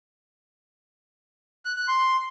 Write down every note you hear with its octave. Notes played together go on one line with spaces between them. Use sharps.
F#6
F#6
C6